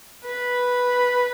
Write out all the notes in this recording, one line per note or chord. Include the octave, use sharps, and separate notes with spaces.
B4